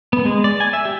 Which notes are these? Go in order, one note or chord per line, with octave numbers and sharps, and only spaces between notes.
B3
G#3
D5
G#5
E5
G4